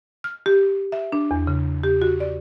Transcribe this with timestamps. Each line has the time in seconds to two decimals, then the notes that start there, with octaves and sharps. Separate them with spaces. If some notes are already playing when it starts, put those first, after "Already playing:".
0.24 F6
0.46 G4
0.92 E5
1.12 D4
1.31 E2
1.47 C#3
1.84 G4
2.02 F#4
2.20 D5